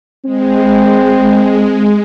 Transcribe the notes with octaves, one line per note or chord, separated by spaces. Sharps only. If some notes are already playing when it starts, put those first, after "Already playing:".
G#3 C4